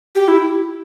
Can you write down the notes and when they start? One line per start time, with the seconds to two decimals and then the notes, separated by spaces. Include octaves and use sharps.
0.15 G4
0.28 E4